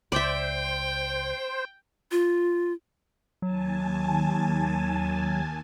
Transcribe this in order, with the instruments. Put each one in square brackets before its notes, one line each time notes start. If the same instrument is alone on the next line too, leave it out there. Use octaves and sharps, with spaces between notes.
[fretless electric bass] C#2 [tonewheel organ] C5 [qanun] D5 E5 [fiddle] G5
[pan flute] F4
[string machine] D#2 G#5 A5 [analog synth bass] F#3